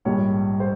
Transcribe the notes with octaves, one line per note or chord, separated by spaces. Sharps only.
A#1 G#2 G3 C#5
C5